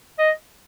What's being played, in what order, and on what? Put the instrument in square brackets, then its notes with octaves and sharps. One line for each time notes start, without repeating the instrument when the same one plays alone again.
[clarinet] D#5